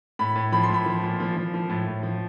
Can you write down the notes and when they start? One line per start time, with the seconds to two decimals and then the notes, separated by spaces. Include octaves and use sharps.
0.19 A2 B5
0.36 A2
0.52 F3 B5
0.63 C6
0.70 A2 B5
0.86 F3
1.03 A#2
1.20 F3
1.37 F3
1.54 F3
1.69 A2
1.87 A2
2.03 F3